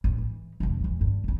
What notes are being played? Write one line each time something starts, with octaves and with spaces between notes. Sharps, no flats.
A1
E3
E1 E3
E2 E3
G2
D2 C#3